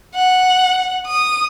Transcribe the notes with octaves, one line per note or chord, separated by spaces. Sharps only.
F#5
D#6